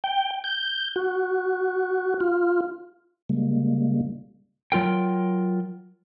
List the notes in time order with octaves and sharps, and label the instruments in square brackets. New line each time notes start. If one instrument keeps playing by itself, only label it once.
[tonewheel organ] G5
G6
F#4
F4
C#3 G3 G#3 A#3
[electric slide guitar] F#3 F4 A#4 G5